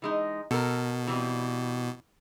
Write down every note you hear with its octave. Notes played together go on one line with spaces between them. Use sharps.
E3 G#3 D#4
B2 A4 A#4
E3 G3 C4